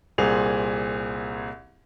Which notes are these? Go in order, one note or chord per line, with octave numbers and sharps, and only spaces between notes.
C2 A#2 C4 G#4 F7